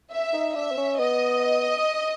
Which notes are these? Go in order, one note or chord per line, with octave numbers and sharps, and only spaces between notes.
E5
D#4
D4 E5
C4
C#4
B3 D#5